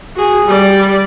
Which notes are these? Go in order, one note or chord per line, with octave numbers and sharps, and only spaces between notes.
F#4 G#4
G3 D5